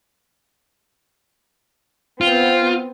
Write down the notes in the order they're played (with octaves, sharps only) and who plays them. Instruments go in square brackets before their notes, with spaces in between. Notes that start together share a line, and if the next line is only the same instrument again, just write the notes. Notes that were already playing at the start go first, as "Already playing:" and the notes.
[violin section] B3 C4 [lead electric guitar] F4